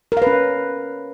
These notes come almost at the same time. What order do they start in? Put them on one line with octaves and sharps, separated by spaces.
A#4 F5 B4 C#4